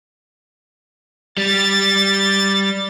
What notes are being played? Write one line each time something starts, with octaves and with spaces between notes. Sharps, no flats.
G3 A6